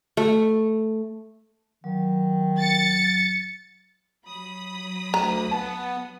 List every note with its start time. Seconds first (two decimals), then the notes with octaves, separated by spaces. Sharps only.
0.17 A3
1.84 D#3 F#3
2.58 A6 C#7
4.25 F#3 B5 D#6
5.14 D2 A#5
5.51 B3 A5